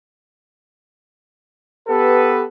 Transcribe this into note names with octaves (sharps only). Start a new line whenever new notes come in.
B3 G4 A4 B4